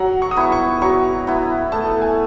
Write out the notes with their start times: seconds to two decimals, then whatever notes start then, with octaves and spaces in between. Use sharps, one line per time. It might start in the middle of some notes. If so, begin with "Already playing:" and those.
Already playing: F#3 F#5
0.22 C#6
0.31 D#6
0.36 B3 E4 C#6
0.52 C#6
0.81 F#3 C#6
1.27 B3 E4
1.72 A3 A5
2.02 G#5